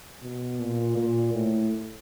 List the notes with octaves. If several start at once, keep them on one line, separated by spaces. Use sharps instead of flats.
B2
A#2
A#2
A2